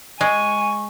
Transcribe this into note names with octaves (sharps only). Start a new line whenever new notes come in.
G#3 G#5 C#6